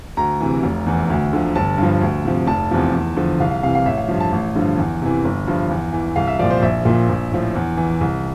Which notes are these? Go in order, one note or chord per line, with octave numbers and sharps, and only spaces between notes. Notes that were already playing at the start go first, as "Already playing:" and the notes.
D2 A#5
C3 E3
F1
E2 E3
D2
D3 F3
G1 A5
G2 F3
D2
C3 F3
F1 A5
E2 C3 F3
E2
D3 F3
C2 F5
F5
C3 E3 F5
F5
A1 E5
F5
G2 F3
A5
A1
G2 D3 F3
E2
C3 E3
G1
G2 F3
E2
E3
C2 F5
E5
A#2 F3 D5
C5
A#1 E5
A#2 F3
A#1
A2 F3
E2
E3
C2